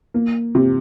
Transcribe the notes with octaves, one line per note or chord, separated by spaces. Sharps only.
A#3
C3